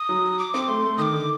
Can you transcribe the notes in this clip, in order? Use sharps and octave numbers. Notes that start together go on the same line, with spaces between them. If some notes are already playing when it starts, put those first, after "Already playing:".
Already playing: D#6
F#3
D6
C4 D6
A3 C6
A3
D#3 D6 D#6
D3